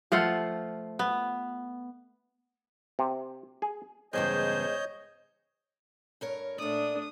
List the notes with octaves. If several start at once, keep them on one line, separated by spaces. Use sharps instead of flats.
F3 A3 F4 F#5
B3
C3
G#4
E2 G2 C#3 G#3 C5 C#5 D#5 G6
G2 A#4 C#5
A#2 A3 D4 D5 D#6